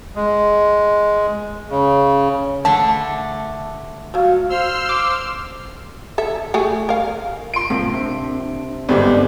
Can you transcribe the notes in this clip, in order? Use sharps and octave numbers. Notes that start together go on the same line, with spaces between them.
G#3
C#3
D3 A3 D4 A5
F#3 G3 F#4 F5
C5 C6 E6 F6
D6
A4 E5
A3 G4 G#4
A#4 F5
F4 C6 D7
A2 C3 A#3
C3 D4
G1 G#2 D3 C4 G4 D5